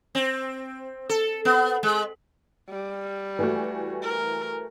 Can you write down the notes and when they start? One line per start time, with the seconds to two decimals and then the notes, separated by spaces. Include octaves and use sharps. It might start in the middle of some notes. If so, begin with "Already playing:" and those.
0.15 C4
1.09 A4
1.45 B3
1.83 G#3
2.70 G3
3.39 E3 A3 F#4
4.03 A#4